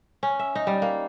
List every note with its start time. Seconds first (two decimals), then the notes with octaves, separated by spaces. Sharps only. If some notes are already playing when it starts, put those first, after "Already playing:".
0.23 C#4
0.39 E5
0.55 D#4
0.67 G3
0.82 A#3